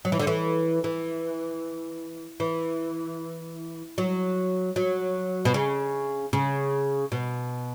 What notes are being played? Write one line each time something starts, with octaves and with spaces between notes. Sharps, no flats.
F#3
E3
D3
E3
E3
E3
F#3
F#3
B2
C#3
C#3
B2